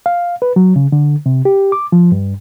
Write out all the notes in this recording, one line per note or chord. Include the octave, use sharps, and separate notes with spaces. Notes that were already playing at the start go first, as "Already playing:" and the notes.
F5
B4
F#3
C#3
D3
C3
G4
D6
F3
G2